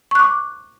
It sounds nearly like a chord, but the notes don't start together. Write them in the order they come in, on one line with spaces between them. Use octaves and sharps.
C#6 F#6 D6